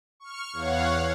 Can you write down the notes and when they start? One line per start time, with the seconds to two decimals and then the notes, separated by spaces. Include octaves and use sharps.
0.20 C#6 F6
0.53 E2 C#5 F5 F#5